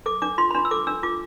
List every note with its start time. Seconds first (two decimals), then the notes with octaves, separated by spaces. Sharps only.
0.06 A4 D6
0.22 D4 D6
0.38 F4 C6
0.51 B5
0.55 D4 C6
0.65 E6
0.71 A4 D6
0.87 D4 E6
1.03 F4 D6